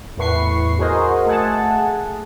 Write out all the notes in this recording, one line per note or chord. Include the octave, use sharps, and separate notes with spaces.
E2 A2 B4 C#6 C7
F#4 G#4 A#4 C5 D#5
A3 G#4 F#5 G#5 A5